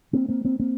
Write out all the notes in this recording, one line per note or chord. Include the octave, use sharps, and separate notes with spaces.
A#3 C4
A#3 C4
A#3 C4
A#3 C4